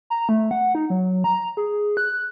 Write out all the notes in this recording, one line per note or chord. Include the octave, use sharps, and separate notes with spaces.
A#5
A3
F#5
D#4
F#3
A#5
G#4
F#6